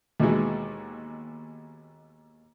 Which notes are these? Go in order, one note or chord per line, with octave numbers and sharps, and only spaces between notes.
D#2 B2 E3 G#3